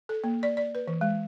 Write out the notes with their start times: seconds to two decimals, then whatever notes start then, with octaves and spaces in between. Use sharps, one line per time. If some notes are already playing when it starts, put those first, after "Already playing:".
0.09 A4
0.24 A#3
0.43 D5
0.57 D5
0.75 B4
0.87 E3
1.01 G#3